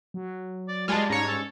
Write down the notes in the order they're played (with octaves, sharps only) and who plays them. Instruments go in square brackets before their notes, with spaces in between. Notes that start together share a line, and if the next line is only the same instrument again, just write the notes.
[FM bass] F#3
[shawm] D5
[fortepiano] G3 A5 [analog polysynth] G#3 F4 [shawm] D5
[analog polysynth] G#2 C#5 [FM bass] C#4 [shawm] A#5
[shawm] A4